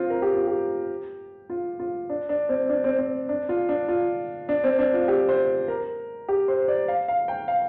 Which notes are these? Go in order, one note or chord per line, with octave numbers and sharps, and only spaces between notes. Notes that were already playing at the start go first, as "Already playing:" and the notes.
Already playing: C4 F4
A#4
G4
F4
G4
F4
F4
D4
D4
C4
D4
C4
C4
D4
F4
D4
F4
D4
C4
D4
F4
G4
C5
A#4
G4
C5
C5
D5
F5
F5
G5
F5